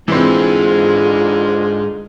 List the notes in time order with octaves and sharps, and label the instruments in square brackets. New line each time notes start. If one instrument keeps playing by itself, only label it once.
[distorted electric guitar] G#2 [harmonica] D3 G#3 [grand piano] E3 C4 [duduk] F4